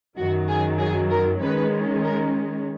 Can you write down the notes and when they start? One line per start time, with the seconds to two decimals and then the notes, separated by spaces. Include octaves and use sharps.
0.18 F#2 D#3 F#3 F#4
0.48 G#4
0.80 G#4
1.10 A#4
1.41 D#3 G#3 C#4 B4
2.03 A#4